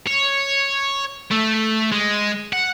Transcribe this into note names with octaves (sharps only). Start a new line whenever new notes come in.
C#5
A3
G#3
F#5